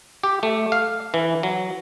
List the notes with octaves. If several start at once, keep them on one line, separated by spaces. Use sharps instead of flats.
G4
A3
F5
E3
F#3